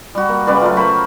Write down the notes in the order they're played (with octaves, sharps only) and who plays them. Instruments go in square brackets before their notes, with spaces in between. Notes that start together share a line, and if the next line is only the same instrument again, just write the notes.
[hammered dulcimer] G3 F#4
A#3
C#3 G3 B4 D5
F#3 A3 F4
A#4 C5 B5 C#6